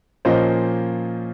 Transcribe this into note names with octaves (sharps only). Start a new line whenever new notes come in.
A#2 F3 A#3 C#4 C5 D#5